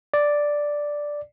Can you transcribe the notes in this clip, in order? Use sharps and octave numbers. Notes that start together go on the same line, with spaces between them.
D5